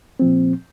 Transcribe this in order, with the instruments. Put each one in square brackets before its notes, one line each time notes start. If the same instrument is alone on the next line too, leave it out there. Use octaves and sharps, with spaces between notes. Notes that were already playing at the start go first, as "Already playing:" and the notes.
[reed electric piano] A#2 F3 C4